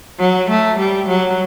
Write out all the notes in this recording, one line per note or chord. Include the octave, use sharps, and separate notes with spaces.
F#3
A3
G3
F#3